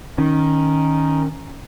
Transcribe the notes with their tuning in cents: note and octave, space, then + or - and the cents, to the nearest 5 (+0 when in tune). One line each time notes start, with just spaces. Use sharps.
D#3 +0 C#4 +0